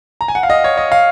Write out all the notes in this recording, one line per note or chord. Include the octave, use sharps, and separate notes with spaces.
A#5
G#5
F#5
F5
D#5
C#5
D#5
F5